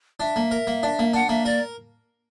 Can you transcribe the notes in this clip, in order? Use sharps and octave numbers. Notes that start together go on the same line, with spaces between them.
D4 E5
A#3
A#4
A#3
D4
A#3
D4 F#5
A#3 E5
A#4 D5